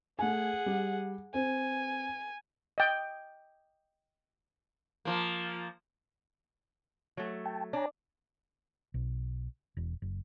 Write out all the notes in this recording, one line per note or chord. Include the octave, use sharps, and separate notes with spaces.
A3 G#4 F#5 G#5
G3
C4 G#5
D#5 G5
F3 A#3
F#3 A3
G5 A5
D4 C#5 G#5 A#5
B1
E1
F#1